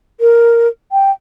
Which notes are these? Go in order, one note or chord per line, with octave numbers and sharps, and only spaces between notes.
A#4
G5